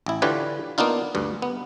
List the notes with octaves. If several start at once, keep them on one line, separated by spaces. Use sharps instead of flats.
A1 E4
D3 E3 F4 G4 B4 C#5
A#3 B3 D4 D#4 F4
D2 G2
B3